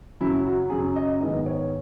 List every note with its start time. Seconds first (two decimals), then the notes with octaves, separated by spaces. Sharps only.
0.20 F#2 C#3 F#3 E4
0.46 F#4
0.70 F#2 C#3 F#3 G#4
0.96 D#5
1.21 G#2 D#3 G#3 B3 D#5
1.46 C#5